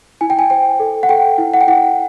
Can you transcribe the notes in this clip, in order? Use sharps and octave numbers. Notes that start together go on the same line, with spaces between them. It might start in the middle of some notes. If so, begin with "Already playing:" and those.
E4 G#5
G5
G#5
C5 G5
A4
F#5
A4 G5
E4
F#5
G5
E4 F#5